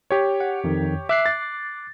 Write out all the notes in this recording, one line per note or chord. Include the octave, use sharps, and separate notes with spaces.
G4 C#5
F#5
F2 D#3
E5 D6 F#6 C7
A6